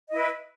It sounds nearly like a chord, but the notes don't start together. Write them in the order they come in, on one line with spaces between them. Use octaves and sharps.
D#5 E4 B4